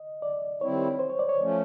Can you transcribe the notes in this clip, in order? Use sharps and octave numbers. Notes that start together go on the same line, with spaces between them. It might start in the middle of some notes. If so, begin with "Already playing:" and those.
Already playing: D#5
D5
D#3 G3 C4 E4 C#5
C5
C#5
D5
C#5
F3 A3 C#4